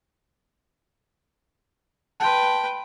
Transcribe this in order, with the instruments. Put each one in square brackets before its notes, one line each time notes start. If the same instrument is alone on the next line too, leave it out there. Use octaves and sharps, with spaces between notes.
[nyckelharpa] B4 G5 [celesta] A5 C6